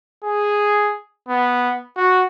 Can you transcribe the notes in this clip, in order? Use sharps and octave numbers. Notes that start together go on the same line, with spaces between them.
G#4
B3
F#4